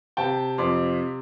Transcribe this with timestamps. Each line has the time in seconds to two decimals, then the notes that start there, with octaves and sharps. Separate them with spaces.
0.17 C3 G5 A5
0.58 F2 C6 D6